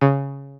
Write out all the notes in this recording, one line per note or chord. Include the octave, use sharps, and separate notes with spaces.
C#3